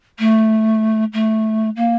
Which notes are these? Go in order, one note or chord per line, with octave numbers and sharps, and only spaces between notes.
A3
A3
A#3